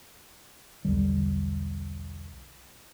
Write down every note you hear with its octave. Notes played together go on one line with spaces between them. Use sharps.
B1 E2 D3 G3